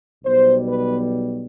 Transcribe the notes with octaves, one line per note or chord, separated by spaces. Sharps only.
B1 B2 G3 C5
B4